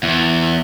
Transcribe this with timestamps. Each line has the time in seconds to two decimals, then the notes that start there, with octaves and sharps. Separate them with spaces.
0.03 E2